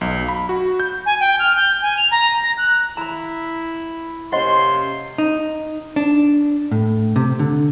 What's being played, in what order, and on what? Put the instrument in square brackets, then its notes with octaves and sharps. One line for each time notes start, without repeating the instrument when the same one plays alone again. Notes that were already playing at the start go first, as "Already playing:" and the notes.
[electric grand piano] B1
B5
F#4
G6
[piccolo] G#5
G5
F6
G6
G#5
F7
A#5
A#6
F#6
[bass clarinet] E4 [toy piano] A#5 B5
[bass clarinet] C3 [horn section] A#3 C#4 C6 [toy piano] C5 D#5 F#5
[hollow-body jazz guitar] D#4
D4
A2
C3
D3